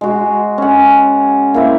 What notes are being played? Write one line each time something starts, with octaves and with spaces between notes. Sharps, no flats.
G#3 F#4
C#4 F#5
A#3 E4 C5